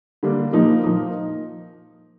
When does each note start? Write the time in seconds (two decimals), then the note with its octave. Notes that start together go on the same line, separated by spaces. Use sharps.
0.23 D3 G3 A#3 D4
0.53 A#2 F3 A#3 D#4
0.83 A#2 F3 A#3 D#4